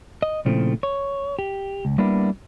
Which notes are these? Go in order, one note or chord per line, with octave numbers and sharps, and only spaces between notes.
D#5
A#2 C#3 F3 A3 C4 E4
C#5
G4
C#2
G3 A#3 B3 D4 E4